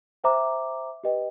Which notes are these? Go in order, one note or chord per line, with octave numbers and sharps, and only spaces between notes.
C5 E5 G5 A#5 D6
G4 B4 D#5 G5